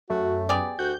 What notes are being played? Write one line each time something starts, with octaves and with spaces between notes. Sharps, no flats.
F#2 A3 F#4
B3 G4 G#4 D5
D2 F#4 G6